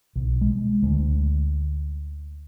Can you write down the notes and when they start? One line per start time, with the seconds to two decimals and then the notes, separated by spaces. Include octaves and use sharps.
0.16 B1
0.41 G#3
0.83 D2